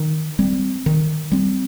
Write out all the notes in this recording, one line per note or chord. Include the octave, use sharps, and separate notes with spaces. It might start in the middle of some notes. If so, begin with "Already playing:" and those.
Already playing: D#3
G3 C4
D#3
G3 C4